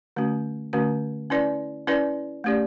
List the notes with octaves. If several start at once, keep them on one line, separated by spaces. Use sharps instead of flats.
D3 A3 C#4 F#4
D3 A3 C#4 F#4
C#4 E4 B4 D5
C#4 E4 B4 D5
A3 C#4 G4 D5